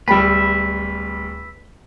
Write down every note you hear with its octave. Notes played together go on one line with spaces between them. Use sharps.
D1 G3 B4 E5 G5 B5